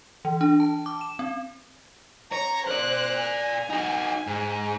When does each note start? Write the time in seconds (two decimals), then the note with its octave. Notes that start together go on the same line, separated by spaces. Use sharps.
0.25 E3
0.41 D4
0.60 A5
0.86 D6
1.01 E7
1.19 C4
2.32 C#5 A#5 A#6
2.67 A#4 C5 D5 F#6
3.21 G#5
3.70 D#4 F#4
4.27 G#2